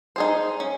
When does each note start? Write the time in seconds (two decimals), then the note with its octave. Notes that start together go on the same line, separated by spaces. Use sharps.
0.16 D#4 G#4 C5
0.60 C#4